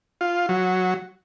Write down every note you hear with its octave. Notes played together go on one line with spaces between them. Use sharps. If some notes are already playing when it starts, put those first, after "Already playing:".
F4
F#3